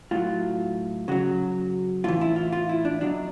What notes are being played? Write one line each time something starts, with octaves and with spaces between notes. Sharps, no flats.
A2 F#3 F4
C#3 F#3 F#4
A2 E3 F4
E4
F4
F4
E4
D4
B2 F#3 D4